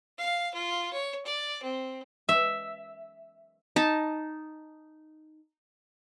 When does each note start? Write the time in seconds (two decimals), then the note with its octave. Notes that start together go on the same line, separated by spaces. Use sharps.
0.18 F5
0.54 F4
0.93 C#5
1.25 D5
1.63 C4
2.29 E5
3.76 D#4 A5